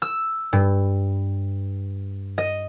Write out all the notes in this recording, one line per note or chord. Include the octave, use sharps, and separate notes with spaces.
E6
G2
D#5